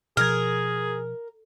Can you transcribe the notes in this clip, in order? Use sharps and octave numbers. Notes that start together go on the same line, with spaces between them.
B2 F3 G#4 A#4 F6 G#6